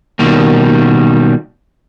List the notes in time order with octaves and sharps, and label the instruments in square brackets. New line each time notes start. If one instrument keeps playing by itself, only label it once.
[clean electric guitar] B2 D#3 G3 A#3